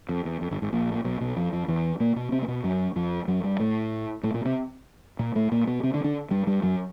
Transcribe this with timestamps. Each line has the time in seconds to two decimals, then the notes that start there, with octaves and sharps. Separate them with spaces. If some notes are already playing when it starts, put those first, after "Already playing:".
0.09 F2
0.25 E2
0.41 F2
0.51 G1 G2
0.62 G#1 G#2
0.72 A#1 A#2
0.94 A#2
1.04 B1 B2
1.21 B1 B2
1.36 F2 F3
1.52 F2 F3
1.68 E2 E3
2.00 A#2 A#3
2.16 B2 B3
2.32 C3 C4
2.42 A#3
2.48 B2 B3
2.64 F#2 F#3
2.96 F2 F3
3.28 F#2 F#3
3.43 G2 G3
3.60 A2 A3
4.23 A2 A3
4.34 A#2 A#3
4.45 C3 C4
5.19 A#2 A#3
5.35 A2 A3
5.52 A#2 A#3
5.67 B2 B3
5.83 C3 C4
5.94 D3 D4
6.04 D3 D4
6.31 G2 G3
6.47 G2 G3
6.63 F#2 F#3